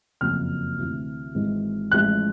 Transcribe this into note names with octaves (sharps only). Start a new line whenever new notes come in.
F#1 F2 C#3 F#3 A#3 F6
D2 C3 E3
G#1 G#2 E3 G#3
A1 A2 F3 G#3 F#6